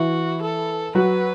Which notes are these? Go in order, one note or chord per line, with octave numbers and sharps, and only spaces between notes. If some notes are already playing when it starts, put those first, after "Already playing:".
Already playing: E3 E4 F#4
A4
F#3 F#4 B4